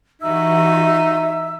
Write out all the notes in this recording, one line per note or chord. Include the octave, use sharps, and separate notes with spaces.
E3 D#4 F#4 G4 E5 E6